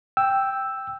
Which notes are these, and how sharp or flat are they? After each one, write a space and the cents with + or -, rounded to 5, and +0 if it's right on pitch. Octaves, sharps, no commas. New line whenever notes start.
G5 +0 E6 +0